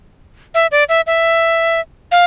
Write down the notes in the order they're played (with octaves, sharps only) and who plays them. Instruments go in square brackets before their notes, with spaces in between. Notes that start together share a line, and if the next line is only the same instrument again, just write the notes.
[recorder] E5
D5
E5
E5
F5